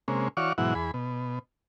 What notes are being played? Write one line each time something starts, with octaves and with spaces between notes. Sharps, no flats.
C3 G#3 A#3 C#4
E3 F#4 C#5 D5 F5 C#6
G#2 B2 E3 F#3 E4 F#5
E2 G#4 B5
B2